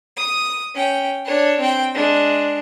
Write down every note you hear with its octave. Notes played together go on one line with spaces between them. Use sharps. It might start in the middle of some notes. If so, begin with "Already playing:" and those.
D#6
C#4 G5
D4 C#5
C4 G5
G#3 D4